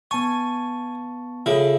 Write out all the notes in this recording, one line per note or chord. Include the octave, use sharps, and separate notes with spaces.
B3 G#5 A5 C#6
C#3 F4 G#4 A4 E5 B5